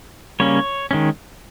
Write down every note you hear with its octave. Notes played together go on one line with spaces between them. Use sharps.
C#3 G3 A#3 C#4 C#5
D#3 G#3 C#4